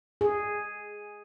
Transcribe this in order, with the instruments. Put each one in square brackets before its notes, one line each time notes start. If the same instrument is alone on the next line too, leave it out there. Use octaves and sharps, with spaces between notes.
[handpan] G#4